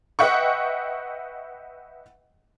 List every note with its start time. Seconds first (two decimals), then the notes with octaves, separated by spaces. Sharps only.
0.19 B4 D#5 E5 F#5 G5 C#6